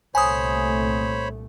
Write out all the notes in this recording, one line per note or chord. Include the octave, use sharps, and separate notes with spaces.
C2 A#2 A3 C5 C#5 G#5 B5 D#6